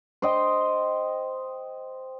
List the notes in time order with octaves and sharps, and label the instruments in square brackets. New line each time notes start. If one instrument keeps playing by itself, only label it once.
[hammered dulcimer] C5 D#5 G5